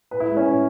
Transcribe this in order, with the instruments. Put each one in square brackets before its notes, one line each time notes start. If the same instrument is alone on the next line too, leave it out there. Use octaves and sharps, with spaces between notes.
[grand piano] A2 B4
E4
G#3
C#4
A2